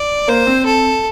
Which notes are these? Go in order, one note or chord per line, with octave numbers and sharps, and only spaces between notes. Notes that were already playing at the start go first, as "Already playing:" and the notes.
Already playing: D5
A#3 C5
C4
A4